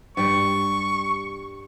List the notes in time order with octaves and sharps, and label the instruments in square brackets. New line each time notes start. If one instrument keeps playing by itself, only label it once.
[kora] G2 G3 [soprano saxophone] C#6